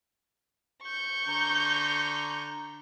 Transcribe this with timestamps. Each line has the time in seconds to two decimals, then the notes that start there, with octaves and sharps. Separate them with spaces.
0.83 C#6 G6
1.28 D3 A#5